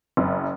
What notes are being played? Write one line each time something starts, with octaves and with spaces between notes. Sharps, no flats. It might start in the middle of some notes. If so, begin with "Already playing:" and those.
F#1